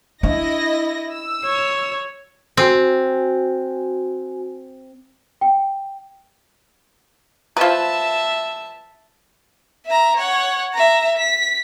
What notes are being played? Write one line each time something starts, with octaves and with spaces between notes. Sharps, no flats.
D4 E4 D#5 A#6
E6
C#5
C4 F#4 G#5
G5
F3 B4 E5 A5
E5 A#5
C#5 F#5
E5 A#5
B6